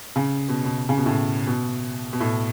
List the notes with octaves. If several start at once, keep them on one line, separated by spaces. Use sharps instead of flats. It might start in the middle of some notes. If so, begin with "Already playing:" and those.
C#3
B2
B2
C#3
B2
A2
B2
B2
A2